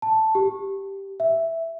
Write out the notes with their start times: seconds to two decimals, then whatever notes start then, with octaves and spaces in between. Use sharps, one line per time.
0.02 A5
0.35 G4
1.20 E5